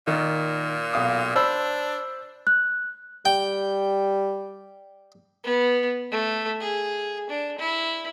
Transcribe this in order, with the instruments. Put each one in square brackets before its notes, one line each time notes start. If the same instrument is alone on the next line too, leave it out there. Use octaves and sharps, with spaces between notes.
[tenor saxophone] A#2 [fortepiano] D#3
[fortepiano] B1 F5 D#6
[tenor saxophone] D4 [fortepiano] C5 B5 E6
[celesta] F#6
[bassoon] G3 [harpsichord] G5
[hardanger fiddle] B3
A3
G#4
D4
E4